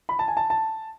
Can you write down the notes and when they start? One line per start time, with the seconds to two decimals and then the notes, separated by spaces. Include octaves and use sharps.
0.09 B5
0.19 A5
0.28 G#5
0.37 A5
0.50 A5